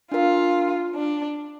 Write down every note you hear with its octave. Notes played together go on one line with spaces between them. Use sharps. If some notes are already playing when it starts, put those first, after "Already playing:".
D4 F4 A#4 F5
D4